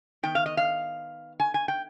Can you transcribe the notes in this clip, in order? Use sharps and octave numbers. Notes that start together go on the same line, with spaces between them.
D#3 B3 G5
F5
D#5
F5
G#5
G#5
G5